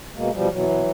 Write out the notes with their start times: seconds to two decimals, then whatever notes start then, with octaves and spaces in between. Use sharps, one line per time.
0.15 B2 G#3 A#3
0.33 B2 F3 G3
0.50 B2 E3 F#3
0.69 B2